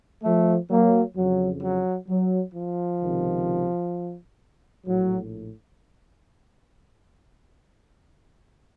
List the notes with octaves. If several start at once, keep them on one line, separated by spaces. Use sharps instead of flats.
F3 A3
F#3 A#3
F2 C#3 F#3
F#3
F#3
F3
C#2 C3 D#3
A#1 A2 F#3